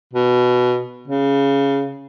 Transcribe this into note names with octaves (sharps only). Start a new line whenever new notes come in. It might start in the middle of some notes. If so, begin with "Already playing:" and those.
B2
C#3